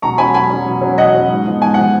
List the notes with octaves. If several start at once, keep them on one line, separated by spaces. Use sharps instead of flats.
B2 A#5 C#6
F#3 C#4 G#5 B5
B2 G#5 B5
F#3 C#4
B2
F#3 C#4
B2 D#5 F#5
F#3 C#4
G#2
F3 B3
G#2 G#5
F3 B3 F#5